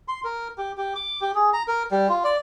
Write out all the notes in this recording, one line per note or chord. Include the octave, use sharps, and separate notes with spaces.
C6
A#4
G4
G4
D6
G4
G#4
A#5
A#4
G3
F4
D5